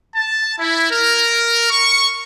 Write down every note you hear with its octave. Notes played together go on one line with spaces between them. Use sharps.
A5
E4
A#4
C#6